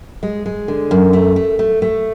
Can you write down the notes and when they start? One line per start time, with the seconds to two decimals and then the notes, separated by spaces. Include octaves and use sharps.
0.23 G#3
0.46 G#3
0.68 D3
0.91 F#2
1.13 A3
1.36 A3
1.59 A3
1.82 A3